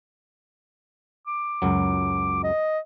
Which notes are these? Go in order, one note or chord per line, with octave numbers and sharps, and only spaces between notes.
D6
C#2 F#2 F#3
D#5